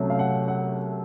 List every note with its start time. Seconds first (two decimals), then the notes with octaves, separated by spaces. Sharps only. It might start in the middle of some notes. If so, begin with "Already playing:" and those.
Already playing: C2 C3 F#3 A3 C#4
0.10 F5
0.19 F#5
0.48 F#5